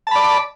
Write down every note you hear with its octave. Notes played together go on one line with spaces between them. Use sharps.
D5 A5 B5